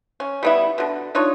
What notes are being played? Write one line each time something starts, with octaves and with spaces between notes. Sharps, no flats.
C#4
G3 B3 E4
B2 D3
D4 D#4 F4 C#5